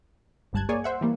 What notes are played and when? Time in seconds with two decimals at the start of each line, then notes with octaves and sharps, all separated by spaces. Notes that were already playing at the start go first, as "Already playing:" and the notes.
0.53 G1 C#2 G2 A5 F#6 G#6
0.69 A#3 G#4 C#5 D5 G#5
0.84 C5 E5 F#5
1.01 E3 G3 A#3